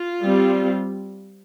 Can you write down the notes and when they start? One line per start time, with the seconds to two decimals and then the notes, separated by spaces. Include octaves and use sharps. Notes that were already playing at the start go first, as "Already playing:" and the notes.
Already playing: F4
0.24 G3 C4